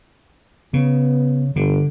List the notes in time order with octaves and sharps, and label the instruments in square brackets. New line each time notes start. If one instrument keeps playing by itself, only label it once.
[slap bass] C#3 [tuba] B3
[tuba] G1 [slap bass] D3